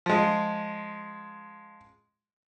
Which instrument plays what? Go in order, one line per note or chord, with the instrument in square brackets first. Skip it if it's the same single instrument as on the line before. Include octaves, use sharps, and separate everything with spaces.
[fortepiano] F3 G#3